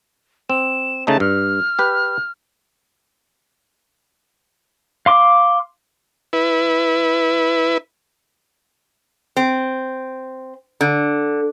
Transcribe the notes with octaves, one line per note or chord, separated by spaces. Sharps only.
C4 E7
C#3 A3 D#4 A5
G2 F6
G4 B4
F5 C6 D6
E4 B4
C4
D3